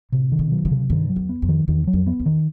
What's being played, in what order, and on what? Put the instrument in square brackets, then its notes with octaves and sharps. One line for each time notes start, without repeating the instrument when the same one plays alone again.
[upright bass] A2 [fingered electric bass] C3
[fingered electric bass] D#3
[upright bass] B2
[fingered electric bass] F#3
[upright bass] C#3
[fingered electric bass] C3
[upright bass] G2 [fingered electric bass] D#3
[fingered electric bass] F#3
[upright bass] E2
[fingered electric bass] B3
[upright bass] F2
[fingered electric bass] D#3
[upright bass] E2 [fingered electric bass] D#3
[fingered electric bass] F#3
[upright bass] F2
[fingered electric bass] B3
[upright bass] E2
[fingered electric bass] D#3